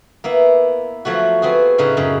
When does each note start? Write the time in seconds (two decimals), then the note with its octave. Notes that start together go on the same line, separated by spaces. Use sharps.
0.24 A#3 B3 E4
1.05 F3 F#3 A3 F#4
1.42 B3 C4 F#4 G#4
1.78 A2 C#3 D#4 F#4
1.97 F#2 C#3